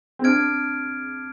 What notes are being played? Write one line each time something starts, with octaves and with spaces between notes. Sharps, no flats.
C4
D4 F6 G#6 D7